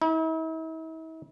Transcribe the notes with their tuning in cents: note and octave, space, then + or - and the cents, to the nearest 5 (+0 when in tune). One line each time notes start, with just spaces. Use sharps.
E4 -45